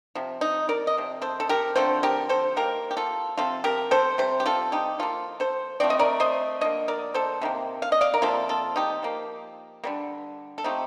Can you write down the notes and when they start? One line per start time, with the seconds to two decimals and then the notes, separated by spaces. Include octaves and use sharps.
0.15 C3 F3
0.41 D#4
0.69 A#4 D5
0.87 D#5
0.97 C3 F3
1.22 A4 C5
1.40 A4
1.49 G4 A#4
1.76 D3 F3 A3 C4 A4 C5
2.03 G4 A#4
2.29 A4 C5
2.56 D#3 A#3 G4 A#4
2.91 G4
2.97 F4 A4
3.37 C3 F3 C4 F4 A4
3.64 G4 A#4
3.91 A4 C5
4.18 C3 G3 C5
4.40 G4
4.46 F4 A4
4.72 D#4 G4
4.99 F3 A#3 F4 A4
5.40 A4 C5
5.80 F3 A3 C4 D5
5.90 D#5
5.99 A#4 D5
6.20 C5 D#5
6.61 D3 F3 A#3 D#5
6.88 A#4 D5
7.14 A4 C5
7.42 C3 D#3 A#3
7.82 F5
7.92 D#5
8.01 D5 F5
8.14 A#4
8.22 C3 F3 A#3 F4 A4
8.49 F4 A4
8.76 D#4 G4
9.03 F3 A#3
9.84 D3 G3 A#3
10.58 A4
10.64 F3 A3 C4 D#4 G4